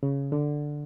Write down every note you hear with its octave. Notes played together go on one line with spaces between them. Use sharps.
C#3
D3